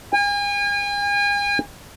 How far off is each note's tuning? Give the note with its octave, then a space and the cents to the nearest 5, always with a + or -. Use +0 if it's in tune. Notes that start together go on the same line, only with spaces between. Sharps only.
G#5 -40